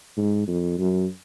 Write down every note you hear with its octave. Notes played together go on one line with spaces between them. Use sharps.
G#2
F2
F#2